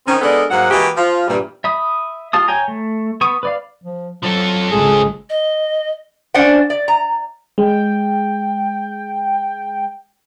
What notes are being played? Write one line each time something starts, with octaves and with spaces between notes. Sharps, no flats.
D#3 C4 C#4
G#3 B3 D4 A4 A#4 D5
G#2 F#3 A#3 F#5
E3 G#3 A#3 F#4 G4
F3 F4
G2 A#2 E3 G3
E5 B5 D#6
F4 G4 F5 A5 D#6
C#5 G5 G#5 A#5
A3
B3 C#6 D#6
B4 D5 F5
F3
F3 F#3 A4
G#1 C#3 G#3 G#4
D#5
C#4 D4 C5 D5 F#5
D5
A#5
G#3 G5